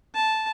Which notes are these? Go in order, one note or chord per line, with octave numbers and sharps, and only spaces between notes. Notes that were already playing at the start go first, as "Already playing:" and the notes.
A5